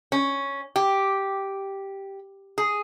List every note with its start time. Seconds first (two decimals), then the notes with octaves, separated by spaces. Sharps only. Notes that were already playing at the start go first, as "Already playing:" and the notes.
0.12 C#4
0.76 G4
2.58 G#4